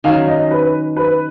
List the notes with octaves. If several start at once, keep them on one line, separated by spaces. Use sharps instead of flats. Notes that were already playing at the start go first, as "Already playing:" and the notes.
D#3 F#3 C#4 F5
D#5
B4
B4